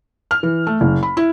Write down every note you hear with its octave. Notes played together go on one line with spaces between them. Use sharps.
F6
E3
A3
F#1
B5
E4